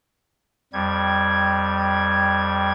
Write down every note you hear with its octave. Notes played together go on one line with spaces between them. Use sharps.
F2 G3 G#6